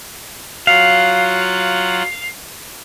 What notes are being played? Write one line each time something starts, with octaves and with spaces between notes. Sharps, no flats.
F#3 F4 F5 F#5